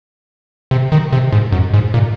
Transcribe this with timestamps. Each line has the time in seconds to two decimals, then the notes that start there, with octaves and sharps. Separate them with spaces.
0.71 C3
0.92 D#3
1.13 C3
1.32 G#2
1.52 F#2
1.74 G#2
1.94 A#2